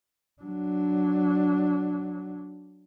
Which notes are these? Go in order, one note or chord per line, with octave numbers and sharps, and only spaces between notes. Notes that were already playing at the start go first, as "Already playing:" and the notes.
F#3 D4